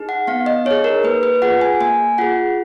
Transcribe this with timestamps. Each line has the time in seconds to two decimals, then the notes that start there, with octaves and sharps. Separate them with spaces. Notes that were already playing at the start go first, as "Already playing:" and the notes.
Already playing: D#4 G#4
0.09 F#5
0.27 B3 F5
0.46 D#5
0.65 D#4 C#5
0.71 G#4
0.84 A#4
1.04 A#3 B4
1.23 B4
1.42 F4 G#4 F#5
1.61 G#5
1.80 A#3 G#5
2.18 F4 G#4 F#5